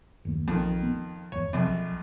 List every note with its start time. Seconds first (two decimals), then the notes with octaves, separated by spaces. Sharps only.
0.25 F#1 D#2 A#3
0.48 A#1 F2 D#3
0.83 B3
1.32 G#1 E2 C#5
1.53 A#1 F2 C3
1.67 B1